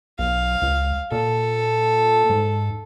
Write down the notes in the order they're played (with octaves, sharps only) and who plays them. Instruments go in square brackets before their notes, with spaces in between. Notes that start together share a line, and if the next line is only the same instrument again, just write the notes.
[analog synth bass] B1 [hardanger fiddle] F5
[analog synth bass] C#2
[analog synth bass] A#2 [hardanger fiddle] A4
[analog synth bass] G#2